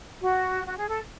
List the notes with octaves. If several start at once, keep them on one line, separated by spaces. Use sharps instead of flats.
F#4
F#4
G#4
A4